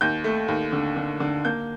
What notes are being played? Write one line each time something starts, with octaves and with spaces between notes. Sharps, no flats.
D#2 G6
A3
D#2
D3
D3
D3
A#3 G6